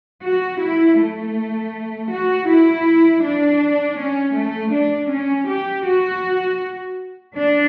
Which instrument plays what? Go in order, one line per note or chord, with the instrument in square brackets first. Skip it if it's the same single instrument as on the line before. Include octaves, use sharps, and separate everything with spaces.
[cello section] F#4
E4
A3
F#4
E4
D4
C#4
A3
D4
C#4
G4
F#4
D4